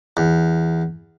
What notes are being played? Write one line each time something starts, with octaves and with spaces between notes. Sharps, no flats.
E2